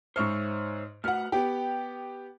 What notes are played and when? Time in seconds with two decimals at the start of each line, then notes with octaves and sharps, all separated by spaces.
0.16 G#2 C5 C#5 E5 C#6 F6
1.04 A3 F#4 B4 F#5 F6
1.32 B3 G4 G5